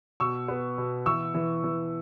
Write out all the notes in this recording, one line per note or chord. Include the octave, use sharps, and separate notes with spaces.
B2 C#6 E6
B3
B2
E3 C#6 E6
E3
E3